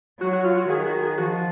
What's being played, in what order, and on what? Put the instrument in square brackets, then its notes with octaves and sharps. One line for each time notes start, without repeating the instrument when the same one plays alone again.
[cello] F#3 [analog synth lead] F#4
[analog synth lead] F#4
F4
F#4
[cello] D#3 [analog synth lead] G#4
[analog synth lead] F#4
G#4
[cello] F3 [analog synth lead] F#4